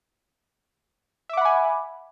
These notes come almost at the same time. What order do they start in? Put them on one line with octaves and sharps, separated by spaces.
E5 D6 F#5 B5 G#5